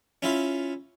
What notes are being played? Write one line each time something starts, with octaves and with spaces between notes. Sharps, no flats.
C#4 E4 F4